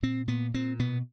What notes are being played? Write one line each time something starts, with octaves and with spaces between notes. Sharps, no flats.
A#2 C4
A#2 B3
A#2 C4
B2 B3